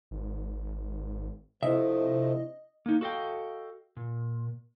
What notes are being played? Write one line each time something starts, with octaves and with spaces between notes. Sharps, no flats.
G#1
C3 F3 A3 D4 E4 D#5 E5
A#3 D#4
F#4 A4 D#5 F5 G5
A#2